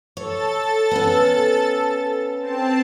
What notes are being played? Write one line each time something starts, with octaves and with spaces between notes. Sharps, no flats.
A4 C#5 A6
B3 C#4
C4 A5